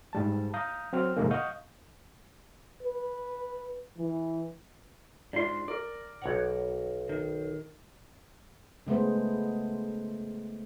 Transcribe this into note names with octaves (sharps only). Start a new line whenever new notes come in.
G#2 G3 A5
F5 A#5 D#6 G6
F#3 C4 F6
F2 G#2 C3 D#3 G#3 A#3
D#5 F5 F#5 C#6 D#6 G6
B4
E3
G#2 D4 F4 D5 C6
A#4 D5
B1 C#5 F#5
D#3
C#3 G#3 A3 B3 C5